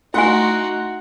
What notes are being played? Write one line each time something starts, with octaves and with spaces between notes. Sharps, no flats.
A3 D#4 E4 F#4 F#5 G#5 C6 F#6